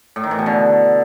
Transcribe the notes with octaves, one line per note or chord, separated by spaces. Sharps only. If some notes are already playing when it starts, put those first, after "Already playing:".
A2
D#3
E3
B2
D3